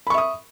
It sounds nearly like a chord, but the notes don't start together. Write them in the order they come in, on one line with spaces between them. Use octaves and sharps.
B5 C#6 E5 D#6